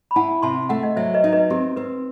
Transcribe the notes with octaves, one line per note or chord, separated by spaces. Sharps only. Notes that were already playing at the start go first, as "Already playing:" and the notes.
B5
E4 F#5 A5
C3 A5 C6
A3 F#5 A5
D#5 F#5
F#3 C5 E5
B4 D#5
D#4
B4 D#5
C4 G4
C4 B4